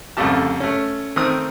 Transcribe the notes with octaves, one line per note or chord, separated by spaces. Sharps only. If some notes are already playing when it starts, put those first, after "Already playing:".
C2 F2 C#3 A3 G4 A5
A3 C#4
D#3 A3 C4 D#6